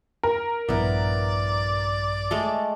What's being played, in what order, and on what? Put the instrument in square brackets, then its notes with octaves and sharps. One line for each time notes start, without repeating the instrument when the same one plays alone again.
[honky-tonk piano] A#4
[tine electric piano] A#1 G2 [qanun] B3 E4 [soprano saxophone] D5
[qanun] G#3 A3 A4